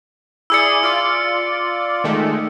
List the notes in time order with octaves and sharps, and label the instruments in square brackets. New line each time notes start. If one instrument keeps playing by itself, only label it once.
[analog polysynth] E4 G#4 D5 [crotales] E6 C#7
[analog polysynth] F4 D5
D#3 G#3 A3